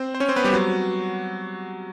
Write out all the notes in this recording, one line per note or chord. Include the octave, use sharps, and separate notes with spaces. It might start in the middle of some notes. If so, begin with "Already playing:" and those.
Already playing: C4 C5
C5
C#4 C#5
C4 C5
B3 B4
G3 G4
F#3 F#4